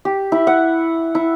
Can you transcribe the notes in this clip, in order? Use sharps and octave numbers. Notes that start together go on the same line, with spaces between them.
G4
E4
F#5
E4